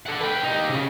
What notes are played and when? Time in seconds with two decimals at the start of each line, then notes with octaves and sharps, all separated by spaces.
0.06 A4 F#5
0.21 B4 G5
0.44 D#4 G4
0.70 C#3